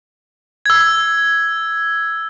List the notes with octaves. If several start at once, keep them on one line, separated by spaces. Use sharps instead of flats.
E6 G#6